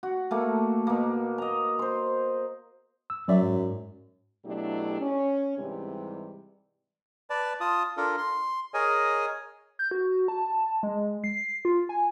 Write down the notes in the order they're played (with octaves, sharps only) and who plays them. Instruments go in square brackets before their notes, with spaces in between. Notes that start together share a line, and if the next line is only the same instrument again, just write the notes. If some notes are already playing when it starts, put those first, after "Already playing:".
[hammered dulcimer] F#4
A3 A#3 A4
B2 A#3
D#5 A#5
C5 C6
[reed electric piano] E6
[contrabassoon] F#2 [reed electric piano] F#3 D5 E5
[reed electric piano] G#2
[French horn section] B2 F#3 A3 D4 E4 G4
C#4
G#2 C3 E3 G3
[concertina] B4 D5 A5
F4 A5 D#6
D4 F4 A4 A#4
C6
G#4 A#4 C#5 D#5 G#5
[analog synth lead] G6
F#4
A5
G#3
C7
F4
G#5